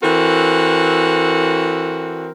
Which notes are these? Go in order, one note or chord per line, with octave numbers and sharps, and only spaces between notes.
E3 C4 F#4 A4 A#4